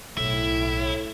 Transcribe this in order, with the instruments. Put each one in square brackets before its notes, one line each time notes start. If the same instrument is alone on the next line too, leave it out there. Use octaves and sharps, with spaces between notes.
[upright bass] B1 [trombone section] A2 [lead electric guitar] E4